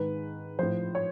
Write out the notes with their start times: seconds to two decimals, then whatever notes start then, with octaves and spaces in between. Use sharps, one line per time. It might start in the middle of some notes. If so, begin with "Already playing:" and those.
Already playing: G#2 D#3 B4
0.59 A2 F3 C5
0.95 C#5